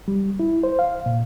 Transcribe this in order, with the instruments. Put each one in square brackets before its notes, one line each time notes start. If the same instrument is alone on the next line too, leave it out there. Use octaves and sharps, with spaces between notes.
[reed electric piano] G3
E4
C5
F5
A#2